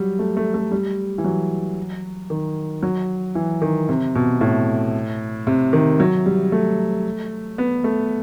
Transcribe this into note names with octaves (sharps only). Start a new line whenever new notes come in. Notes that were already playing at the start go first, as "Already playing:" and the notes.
Already playing: F#3 G3
A3
A3
A3
G3
E3
F#3
D#3
F#3
E3
D#3
C3
B2
A2
C3
D#3
F#3
G3
A3
B3
A3